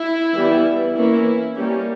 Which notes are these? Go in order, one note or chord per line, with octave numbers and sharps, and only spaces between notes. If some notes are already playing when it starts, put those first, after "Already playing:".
Already playing: E4
E3 G3 B3
E3 A#3 C#4 E4
G3 A#3 C#4 G4